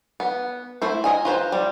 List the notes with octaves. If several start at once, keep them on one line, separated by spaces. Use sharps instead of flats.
B3
A3 E4 C5
A#4 D#5 G#5
F4 B4 C5 A#5
G3